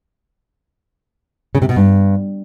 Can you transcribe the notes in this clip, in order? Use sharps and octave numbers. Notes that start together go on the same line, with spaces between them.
C#3
C3
B2
G2